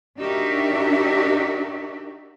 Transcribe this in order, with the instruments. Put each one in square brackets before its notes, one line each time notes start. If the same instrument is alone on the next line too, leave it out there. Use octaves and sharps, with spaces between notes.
[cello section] D4 D#4 F#4 G4 A#4 E5